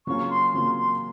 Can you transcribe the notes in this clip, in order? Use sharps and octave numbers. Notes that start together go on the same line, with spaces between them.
C#3 F#3 A#3 C#4 F4 C#6
C6
C#3 F#3 A#3 C#4 F4 C6
C6